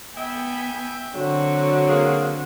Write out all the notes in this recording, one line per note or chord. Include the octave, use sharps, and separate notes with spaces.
B3 E5 G5 G#5
D3 F#3 C4 F#4
A#3 G#4